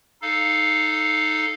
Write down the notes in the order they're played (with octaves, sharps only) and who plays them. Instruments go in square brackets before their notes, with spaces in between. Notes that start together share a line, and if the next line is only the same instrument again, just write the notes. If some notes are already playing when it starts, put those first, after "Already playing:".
[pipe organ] D#4 A4 F5